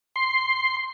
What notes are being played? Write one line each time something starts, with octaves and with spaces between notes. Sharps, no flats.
C6